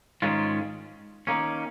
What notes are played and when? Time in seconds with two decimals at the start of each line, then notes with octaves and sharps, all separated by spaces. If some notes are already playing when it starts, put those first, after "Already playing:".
0.22 G#2 D#3 G#3 C#4 F4
1.27 D#3 A#3 C#4